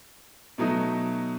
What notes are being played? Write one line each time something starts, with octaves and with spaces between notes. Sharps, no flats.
B2 F#3 A3 D#4